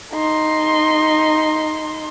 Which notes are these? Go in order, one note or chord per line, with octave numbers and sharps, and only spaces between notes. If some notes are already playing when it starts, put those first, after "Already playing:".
D#4 C6